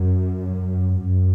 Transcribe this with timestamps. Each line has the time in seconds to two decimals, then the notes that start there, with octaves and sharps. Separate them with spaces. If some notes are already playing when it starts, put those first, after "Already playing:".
Already playing: F#2
1.02 F#2